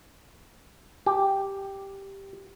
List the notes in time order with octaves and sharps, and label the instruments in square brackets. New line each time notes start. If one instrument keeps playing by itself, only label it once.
[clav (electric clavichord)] G4